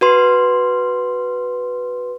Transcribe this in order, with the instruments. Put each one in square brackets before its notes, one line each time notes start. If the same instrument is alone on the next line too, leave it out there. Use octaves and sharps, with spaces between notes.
[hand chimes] F#4 B4 C6